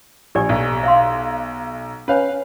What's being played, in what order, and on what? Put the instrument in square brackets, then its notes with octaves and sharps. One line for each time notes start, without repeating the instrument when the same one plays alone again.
[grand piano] A#1 [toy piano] G4 D5 G#5
[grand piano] B1
[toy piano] E5 F5 C6
[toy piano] C#4 C#5 G#5 [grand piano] B4 F5